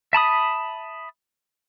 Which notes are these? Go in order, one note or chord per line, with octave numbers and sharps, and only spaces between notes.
E5 A5 B5 D#6